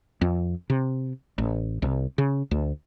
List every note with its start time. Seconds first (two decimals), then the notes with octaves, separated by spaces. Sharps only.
0.21 F2
0.70 C3
1.38 A1
1.82 C2
2.18 C#3
2.51 D2